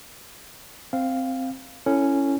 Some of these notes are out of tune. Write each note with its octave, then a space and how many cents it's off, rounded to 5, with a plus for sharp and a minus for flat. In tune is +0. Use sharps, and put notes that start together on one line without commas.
C4 +0 F5 +0
C#4 +0 E4 +15 A4 +30